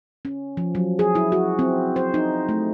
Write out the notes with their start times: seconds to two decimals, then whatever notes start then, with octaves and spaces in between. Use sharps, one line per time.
0.25 C#4
0.57 F3
0.75 F#3
0.99 G#4
1.15 E4
1.32 F#4
1.59 C4
1.96 C5
2.14 D#4
2.49 A3